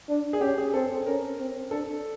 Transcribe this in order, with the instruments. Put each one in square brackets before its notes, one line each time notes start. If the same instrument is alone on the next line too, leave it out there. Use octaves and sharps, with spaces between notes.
[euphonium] D4
[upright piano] G#4
[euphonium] C#4 [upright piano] G4
[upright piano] G#4
[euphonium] C4 [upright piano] A4
[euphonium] C#4 [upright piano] A#4
[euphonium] C4
[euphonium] D4 [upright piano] A4